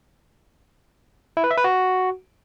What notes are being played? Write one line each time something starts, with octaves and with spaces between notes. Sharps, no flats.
E4
B4
E5
B4
F#4